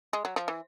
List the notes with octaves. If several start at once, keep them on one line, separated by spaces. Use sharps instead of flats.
G#3
F#3
F3
E3